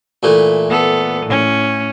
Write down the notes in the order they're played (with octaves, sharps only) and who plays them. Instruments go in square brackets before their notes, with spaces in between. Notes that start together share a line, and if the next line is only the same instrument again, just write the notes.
[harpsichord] A#2 E3 A3
[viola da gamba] B3 A4
A2 C#4